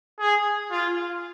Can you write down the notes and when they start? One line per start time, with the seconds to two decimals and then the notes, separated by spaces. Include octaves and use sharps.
0.20 G#4
0.71 F4